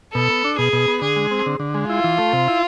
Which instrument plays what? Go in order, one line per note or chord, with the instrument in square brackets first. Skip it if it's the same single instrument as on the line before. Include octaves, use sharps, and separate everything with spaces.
[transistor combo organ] B2 [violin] A4
[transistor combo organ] B3
D4
[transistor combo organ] B2 [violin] G#4
[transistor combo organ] B2
B3
[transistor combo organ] D3 [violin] G#4
[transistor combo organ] G#3
C4
D3
D3
G#3
[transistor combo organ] E4 [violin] F4
[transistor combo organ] E3
A3
C3
E4